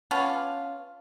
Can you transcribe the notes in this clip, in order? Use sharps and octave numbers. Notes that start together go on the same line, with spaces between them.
B3 C#4 D4 F4